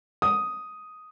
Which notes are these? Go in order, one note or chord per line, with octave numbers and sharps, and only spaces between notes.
D#6